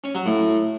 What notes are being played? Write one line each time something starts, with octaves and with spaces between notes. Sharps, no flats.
C#4
F#3
A2